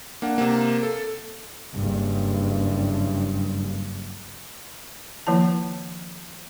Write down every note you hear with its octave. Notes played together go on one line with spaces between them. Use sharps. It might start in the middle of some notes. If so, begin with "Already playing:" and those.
A#3 D4 F#5
C3 A#3
A4
F#1 G2
D#3 F3 A#3 E4 A5